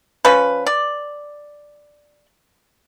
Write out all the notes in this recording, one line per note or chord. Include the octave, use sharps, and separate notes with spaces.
F3 C#4 B4
D5